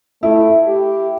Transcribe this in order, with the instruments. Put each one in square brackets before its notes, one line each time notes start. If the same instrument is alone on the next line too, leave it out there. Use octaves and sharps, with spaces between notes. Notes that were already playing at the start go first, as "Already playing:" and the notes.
[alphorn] A3 [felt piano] E4
[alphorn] G4